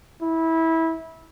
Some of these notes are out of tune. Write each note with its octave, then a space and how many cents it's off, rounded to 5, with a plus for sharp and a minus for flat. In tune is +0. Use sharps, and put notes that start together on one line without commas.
E4 -20